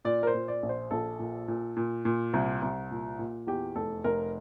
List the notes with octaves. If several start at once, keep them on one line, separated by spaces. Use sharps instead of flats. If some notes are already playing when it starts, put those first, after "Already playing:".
A#2 D5
A#4
C5
A#2
D5
A#1
C5
A#1 A4
A#2
A#2
A#2
A#2
C2
C2
A#2
A#2
E2 G4
F1 A4
F1 A#4